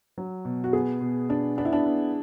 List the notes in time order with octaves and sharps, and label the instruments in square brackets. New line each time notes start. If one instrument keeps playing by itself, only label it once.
[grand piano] F#3
B2
[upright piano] F#4
[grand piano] B3 [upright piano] G#4
[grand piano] B2
[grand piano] B3 [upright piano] D4
[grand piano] B3 [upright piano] D4
[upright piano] E4
D4
[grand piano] B3